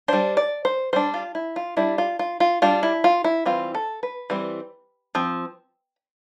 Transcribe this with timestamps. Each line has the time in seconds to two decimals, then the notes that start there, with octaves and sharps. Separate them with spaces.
0.08 G3 D4 C5
0.37 D5
0.65 C5
0.93 G3 D4 C5
1.14 F4
1.35 E4
1.56 F4
1.77 G3 D4 E4
1.98 F4
2.19 F4
2.40 F4
2.62 G3 D4 F4
2.83 E4
3.04 F4
3.24 E4
3.46 E3 G3 C4 F4
3.75 A4
4.03 B4
4.30 E3 G3 C4
5.15 F3 C4